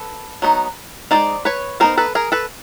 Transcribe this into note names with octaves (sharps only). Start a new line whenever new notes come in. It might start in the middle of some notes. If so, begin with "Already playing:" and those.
Already playing: A4 B4
F#3 B3 D#4
G#3 C4 D#4 C5 D5
B4 C#5
G3 B3 D#4 A#4 C5
A4 B4
G#4 A#4
A4 B4